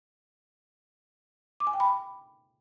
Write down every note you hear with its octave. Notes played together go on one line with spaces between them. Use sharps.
D6
G#5
G5
B5